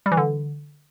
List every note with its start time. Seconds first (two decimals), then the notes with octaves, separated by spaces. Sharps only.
0.06 G3
0.12 E3
0.17 D3